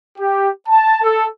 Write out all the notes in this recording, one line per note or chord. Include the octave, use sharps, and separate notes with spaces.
G4
A5
A4